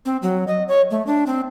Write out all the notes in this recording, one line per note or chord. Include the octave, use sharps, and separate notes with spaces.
C4
F#3
D#5
C#5
A3
D4
C4